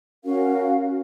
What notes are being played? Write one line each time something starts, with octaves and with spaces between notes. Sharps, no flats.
C#4 F#4 A#4 F5